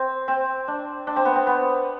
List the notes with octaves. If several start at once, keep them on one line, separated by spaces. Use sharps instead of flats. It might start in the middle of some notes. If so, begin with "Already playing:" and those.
Already playing: C4
C4
D4
D4
C4
B3
C4
B3